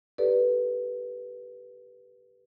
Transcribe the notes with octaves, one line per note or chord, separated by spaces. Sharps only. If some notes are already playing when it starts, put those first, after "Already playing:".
G4 A4 B4 D5